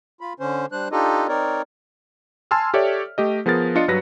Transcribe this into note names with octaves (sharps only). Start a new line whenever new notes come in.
F4 B5
D3 C#4 C5
G3 D4 C5 F#6
D4 D#4 F4 G4 A4 D#5
C4 D#4 A#4 C#5 D5
G#5 A5 C6 E6 F6
G4 A4 C#5 D5 E5
A3 G4 D#5
F3 B3 G#4 A#4 A6
D4 F4 D#5 C#7
G2 F#3 B4 A#6